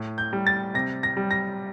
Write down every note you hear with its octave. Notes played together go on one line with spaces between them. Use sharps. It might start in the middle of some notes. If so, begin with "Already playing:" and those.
Already playing: A2
G6
G3
A6
C3 A#6
A#6
G3
A#6